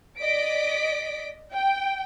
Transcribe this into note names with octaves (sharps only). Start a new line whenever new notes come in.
D5 D#5 B6 D7
G5